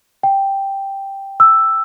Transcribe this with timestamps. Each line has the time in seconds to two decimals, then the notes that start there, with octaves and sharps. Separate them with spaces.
0.23 G5
1.40 E6